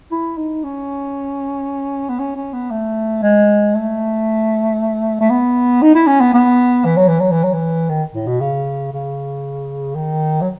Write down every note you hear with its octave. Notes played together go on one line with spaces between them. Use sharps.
E4
D#4
C#4
B3
C#4
C#4
B3
A3
G#3
A3
A3
B3
D#4
E4
C#4
B3
B3
E3
F#3
E3
F#3
E3
F#3
E3
D#3
A2
B2
C#3
C#3
D#3
F#3